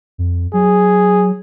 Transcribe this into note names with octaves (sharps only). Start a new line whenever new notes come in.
F2
F#3 G#4